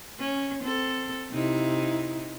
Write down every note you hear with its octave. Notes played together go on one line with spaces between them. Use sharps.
C#4
C4 A4
C3 D#4 E4